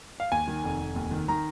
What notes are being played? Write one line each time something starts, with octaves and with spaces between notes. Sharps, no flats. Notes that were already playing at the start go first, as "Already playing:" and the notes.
F5
D#2 G#5
D#3
F1
F1
D#2
D#3
D#3 A#5